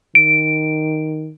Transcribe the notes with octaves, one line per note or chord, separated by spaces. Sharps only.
D#3 D7